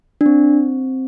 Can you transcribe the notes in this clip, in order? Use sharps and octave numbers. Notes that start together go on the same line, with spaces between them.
D4
C4